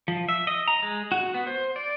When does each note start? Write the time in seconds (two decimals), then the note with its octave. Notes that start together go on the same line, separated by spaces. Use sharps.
0.08 F3
0.29 E5
0.47 D#5
0.68 A#5
0.82 G#3
1.12 F#4
1.34 B3
1.47 C5
1.76 D5